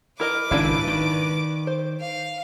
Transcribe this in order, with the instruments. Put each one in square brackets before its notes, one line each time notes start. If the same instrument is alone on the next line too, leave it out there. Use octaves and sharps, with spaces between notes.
[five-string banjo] E4 A#4 D#5 [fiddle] B4 D6
[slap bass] G#1 C#3 [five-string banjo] D4 E4 F5
[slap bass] D#3
[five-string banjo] C5
[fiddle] F5